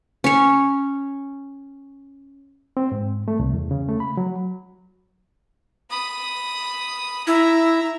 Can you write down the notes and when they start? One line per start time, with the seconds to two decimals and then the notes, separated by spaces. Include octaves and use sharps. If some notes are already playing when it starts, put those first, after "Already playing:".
0.24 C#4 C#5
2.77 C4
2.92 G#2
3.28 A3
3.40 C2
3.53 E2
3.71 C#3
3.89 A3
4.00 B5
4.17 F#3
5.90 B5 D#6
7.27 E4 E5 A#5